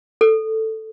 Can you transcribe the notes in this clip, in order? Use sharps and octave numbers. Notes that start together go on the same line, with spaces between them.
A4